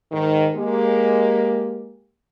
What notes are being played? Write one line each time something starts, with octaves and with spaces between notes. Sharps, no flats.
G#2 D#3
G#3 A#3 G4